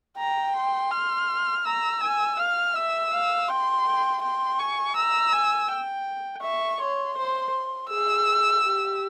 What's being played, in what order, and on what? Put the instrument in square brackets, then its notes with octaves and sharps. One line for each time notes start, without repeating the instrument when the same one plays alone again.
[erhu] G5 [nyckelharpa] A#5
[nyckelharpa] C6
[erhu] F6
[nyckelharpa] A#5 [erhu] E6
[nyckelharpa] G#5
[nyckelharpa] F5 [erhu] F6
[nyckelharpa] E5 [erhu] E6
[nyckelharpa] F5
[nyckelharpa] G5 [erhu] C6
[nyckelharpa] G5
[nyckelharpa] G5 [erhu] C6
[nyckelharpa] G#5 [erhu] C#6
[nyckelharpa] A#5 [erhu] E6
[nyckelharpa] G#5
G5
[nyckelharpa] E5 [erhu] C#6
[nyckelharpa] C#5 [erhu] C6
[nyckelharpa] C5
[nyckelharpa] G#4 [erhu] E6
[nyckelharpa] G4